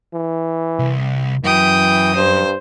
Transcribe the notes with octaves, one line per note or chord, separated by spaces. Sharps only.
E3
C2
F#2 E3 F#3 G5 D#6
G2 C5